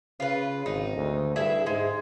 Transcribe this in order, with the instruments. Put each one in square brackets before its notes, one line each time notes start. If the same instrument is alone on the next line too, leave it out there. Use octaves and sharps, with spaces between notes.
[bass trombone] C#3 [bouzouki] F4 B4
[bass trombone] G#1 [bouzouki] D#4
[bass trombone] D2
[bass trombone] G2 [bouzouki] E4 G#4 E5
[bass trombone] G#2 [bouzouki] G#3